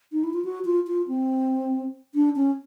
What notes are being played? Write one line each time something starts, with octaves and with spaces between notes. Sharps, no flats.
D#4
E4
F4
F#4
F4
F4
C4
D4
C#4